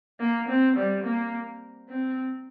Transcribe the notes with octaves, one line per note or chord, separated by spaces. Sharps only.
A#3
C4
G3
A#3
C4